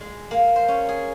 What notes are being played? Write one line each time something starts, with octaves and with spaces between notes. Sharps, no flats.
G#3
A#3
C5
C#4
G#4